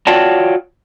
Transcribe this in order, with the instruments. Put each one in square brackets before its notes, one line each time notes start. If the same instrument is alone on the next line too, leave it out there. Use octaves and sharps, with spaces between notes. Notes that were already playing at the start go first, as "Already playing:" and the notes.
[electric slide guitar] F4 F#4 C#5 D5 G5 A5